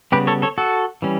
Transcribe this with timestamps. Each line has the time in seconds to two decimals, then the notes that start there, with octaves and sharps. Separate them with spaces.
0.12 C#3 G3 B3 G4 B4
0.27 A4 C#5
0.42 A4 C#5
0.58 F#4 A4
1.02 E3 G3 C#4